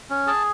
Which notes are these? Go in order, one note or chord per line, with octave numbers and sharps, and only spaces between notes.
C#4
G#4 A5